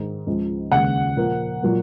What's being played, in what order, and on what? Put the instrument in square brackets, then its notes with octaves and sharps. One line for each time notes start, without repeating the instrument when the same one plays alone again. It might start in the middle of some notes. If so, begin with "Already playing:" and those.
Already playing: [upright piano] G#2 D#3 G#3
C#2 C#3 F3 G#3
D#2 C#3 G#3 F#5
A#2 F3 A#3
A#2 F#3 A#3